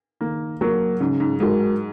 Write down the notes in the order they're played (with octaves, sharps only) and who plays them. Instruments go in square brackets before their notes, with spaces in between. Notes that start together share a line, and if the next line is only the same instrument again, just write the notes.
[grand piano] D#3 [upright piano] A#3
[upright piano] F#3 [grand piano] A#3 F#4 A#4
[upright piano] G#2 [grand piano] C#3
[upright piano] G#2
[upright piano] G#2 [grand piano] G#3 F#4 A#4